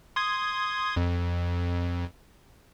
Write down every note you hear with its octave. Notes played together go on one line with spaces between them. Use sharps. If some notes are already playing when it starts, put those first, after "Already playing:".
C6 D#6 G#6
F2